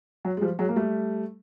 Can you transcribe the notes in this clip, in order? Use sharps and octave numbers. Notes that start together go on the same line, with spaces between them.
F#3
G#3
F3 G3
F#3 G#3
A#3
G3 A3